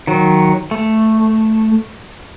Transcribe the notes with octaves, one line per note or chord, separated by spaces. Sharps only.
D#3 F#3
A3